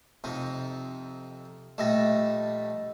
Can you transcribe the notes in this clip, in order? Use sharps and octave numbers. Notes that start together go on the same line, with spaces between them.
F2 C3 D#4
A#1 G3 A3 D#5 E6 A#6